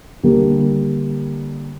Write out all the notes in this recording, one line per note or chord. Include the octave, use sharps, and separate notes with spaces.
D3 G3 A#3